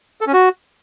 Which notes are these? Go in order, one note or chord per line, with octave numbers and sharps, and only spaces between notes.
A4
C#4
F#4